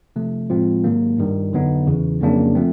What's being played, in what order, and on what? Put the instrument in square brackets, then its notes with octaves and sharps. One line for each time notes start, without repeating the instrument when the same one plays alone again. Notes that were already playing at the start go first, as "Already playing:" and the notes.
[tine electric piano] C3 F3 A3
A2 F3 G#3 C4 F4
G#2 D#3 F#3 A#3
G2 D#3 G3
F2 D3 F#3 B3 D#4
E2 C#3 E3
F2 C#3 F#3 A#3 D4
F3 A3 C4